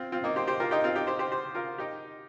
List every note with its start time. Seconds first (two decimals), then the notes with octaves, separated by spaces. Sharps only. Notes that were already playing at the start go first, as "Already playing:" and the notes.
Already playing: C4 F4
0.12 C4 F4
0.24 A#3 D#4
0.36 G4 C5
0.47 G4 C5
0.60 F4 A#4
0.71 D#4 G4
0.84 C4 F4
0.95 D#4 G4
1.07 G4 C5
1.19 G4 C5
1.32 G4 C5
1.55 F4 A#4
1.78 D#4 G4